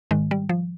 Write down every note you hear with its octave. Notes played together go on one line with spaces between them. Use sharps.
G#2 D#3 G#3
G3
F3